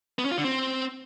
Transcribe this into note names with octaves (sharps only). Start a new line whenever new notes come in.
B3
C#4
F4
D3
C4